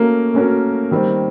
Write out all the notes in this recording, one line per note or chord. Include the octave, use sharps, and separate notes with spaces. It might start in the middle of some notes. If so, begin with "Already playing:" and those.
Already playing: A3 A#3 C#4 F#4 A#4
A3 C#4 F#4 A#4
D#3 G3 C4